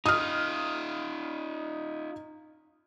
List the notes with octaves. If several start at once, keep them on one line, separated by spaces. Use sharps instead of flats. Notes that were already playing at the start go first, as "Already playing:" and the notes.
D#4 F4 D#6 F6